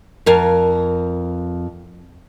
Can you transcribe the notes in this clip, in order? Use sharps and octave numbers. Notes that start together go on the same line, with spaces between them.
F2 A#4 F5